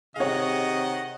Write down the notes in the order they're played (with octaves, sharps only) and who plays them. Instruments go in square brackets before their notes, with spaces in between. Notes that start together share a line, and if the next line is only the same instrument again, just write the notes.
[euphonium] C3 [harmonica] D#3 F#5 [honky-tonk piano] G#4 C#5 [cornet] D#5